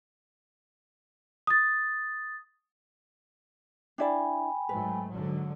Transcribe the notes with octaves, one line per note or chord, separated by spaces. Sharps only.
D#6 A6
D4 E4 D5 G5 G#5 B5
G#2 F#3 A3 B4
G#2 D3 F#3